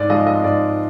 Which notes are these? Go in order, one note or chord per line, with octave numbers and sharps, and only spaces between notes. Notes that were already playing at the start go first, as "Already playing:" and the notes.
Already playing: G#2 D5
F3 G#3 D#5
D#5
G#2 D5